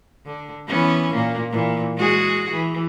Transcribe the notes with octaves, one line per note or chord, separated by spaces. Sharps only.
D3
E3 B3 C#4
A#2 A#3
A#2 E3
G#3 F#4 G#4
E3